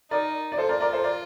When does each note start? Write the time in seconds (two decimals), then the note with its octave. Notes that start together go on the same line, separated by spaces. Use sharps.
0.11 D#4 A#4 D5
0.52 D5
0.58 F4 A4 C5
0.69 A#4 D5
0.81 A#4 D5
0.93 A4 C5
1.04 A#4 D5